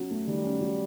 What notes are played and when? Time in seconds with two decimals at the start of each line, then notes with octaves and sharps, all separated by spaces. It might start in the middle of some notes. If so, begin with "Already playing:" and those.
Already playing: F#3 C#4
0.10 A3
0.27 D#3 G3
0.44 C#4
0.61 F#3